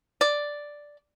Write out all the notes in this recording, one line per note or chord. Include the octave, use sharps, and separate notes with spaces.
D5